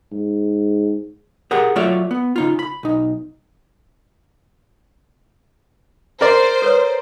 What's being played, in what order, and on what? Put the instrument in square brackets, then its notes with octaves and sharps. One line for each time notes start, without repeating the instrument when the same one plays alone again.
[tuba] G#2
[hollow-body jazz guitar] G4 G#4 A#4 F#5 A#5
F#3 A3 F4 C#5 D5 E5
B3
C#3 D#4 F4
B5
B1 D#4
[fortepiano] A#4 D5 [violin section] C5
[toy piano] A4 B4 C#5